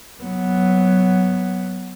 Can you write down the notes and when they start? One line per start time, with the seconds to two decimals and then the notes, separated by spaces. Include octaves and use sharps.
0.23 F#3 B3